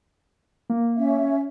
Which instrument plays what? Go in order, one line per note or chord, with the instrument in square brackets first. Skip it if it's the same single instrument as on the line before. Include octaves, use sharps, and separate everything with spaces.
[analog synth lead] A#3
[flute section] C#4 E5